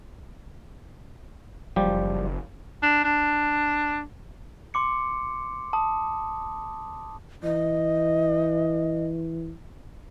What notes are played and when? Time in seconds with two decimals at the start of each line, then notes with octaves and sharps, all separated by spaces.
1.76 F#1 F3 G3 G4
2.83 D4
3.04 D4
4.74 C6 D6 C#7
5.73 A5 D#6
7.43 E3 D#5